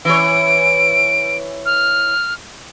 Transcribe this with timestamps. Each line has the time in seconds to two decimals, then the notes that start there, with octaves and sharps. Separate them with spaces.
0.05 E3 C#5 D7
1.65 F6